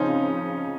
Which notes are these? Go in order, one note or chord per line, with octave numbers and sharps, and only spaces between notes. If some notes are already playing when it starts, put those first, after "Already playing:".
Already playing: C#3 F3 C4 C#4 D#4 F4 C5